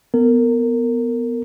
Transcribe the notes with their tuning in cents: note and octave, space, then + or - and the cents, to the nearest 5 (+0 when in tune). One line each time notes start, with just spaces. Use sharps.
B3 +0 A#4 -25